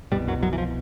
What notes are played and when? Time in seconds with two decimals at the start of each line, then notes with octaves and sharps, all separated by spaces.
0.12 G2 B2 G3
0.15 C2
0.28 F#2 F#3
0.43 F#2 F#3
0.53 E3
0.58 F3